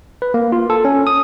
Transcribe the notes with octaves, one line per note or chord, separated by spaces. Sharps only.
B4
A#3
F4
A4
C#4
D#6